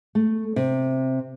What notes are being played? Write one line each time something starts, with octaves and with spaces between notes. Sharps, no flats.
A3
C3